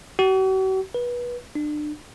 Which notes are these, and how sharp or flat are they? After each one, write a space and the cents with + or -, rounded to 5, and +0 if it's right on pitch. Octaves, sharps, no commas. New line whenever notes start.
F#4 +45
B4 -25
D4 +30